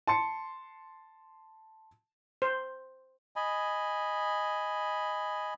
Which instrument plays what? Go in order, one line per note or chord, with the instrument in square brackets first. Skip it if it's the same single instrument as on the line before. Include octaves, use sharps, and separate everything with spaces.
[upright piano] A5 C6 C#7
[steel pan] C5
[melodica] D#5 G#5 B5